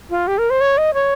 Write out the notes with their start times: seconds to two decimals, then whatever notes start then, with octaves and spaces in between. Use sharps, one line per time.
0.10 F4
0.27 G4
0.38 A#4
0.50 C5
0.61 C#5
0.78 D#5
0.94 C#5